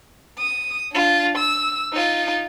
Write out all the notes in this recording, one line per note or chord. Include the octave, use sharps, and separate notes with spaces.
D#6
D4 F4
E6
D#4 F4